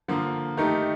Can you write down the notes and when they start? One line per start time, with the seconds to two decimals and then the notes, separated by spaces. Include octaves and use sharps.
0.08 D3 F3 A#3
0.57 D#3 A3 D#4 G4 A#4